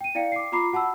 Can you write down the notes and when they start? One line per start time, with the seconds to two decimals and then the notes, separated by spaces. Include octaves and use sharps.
0.01 G5 D#7
0.15 E4 D5 F5 G5 C#7
0.32 D6 C7
0.52 F4 A#5 B5 D6 C7
0.73 F#4 F#5 A5 B5 E6